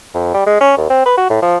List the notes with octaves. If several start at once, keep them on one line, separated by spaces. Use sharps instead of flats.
F2
G3
G#3
C#4
D#2
C4
B4
F#4
A2
F3